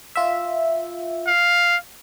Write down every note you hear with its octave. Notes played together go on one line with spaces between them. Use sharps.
F4 E5
F5